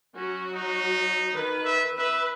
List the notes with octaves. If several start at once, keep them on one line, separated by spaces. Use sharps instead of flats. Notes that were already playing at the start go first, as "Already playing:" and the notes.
F#3 C#4 F#4
D#4
D#3 B4
E5
B4 E5